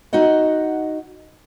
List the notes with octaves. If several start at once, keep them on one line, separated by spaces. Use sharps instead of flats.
D#4 F#4 D#5 F#5